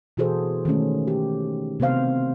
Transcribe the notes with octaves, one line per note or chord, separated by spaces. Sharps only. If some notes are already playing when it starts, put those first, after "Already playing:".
B2 E3 F#4 G#4 A4 C5
D#3 G#3 A3 C#4
G4
C3 B3 C4 C5 F5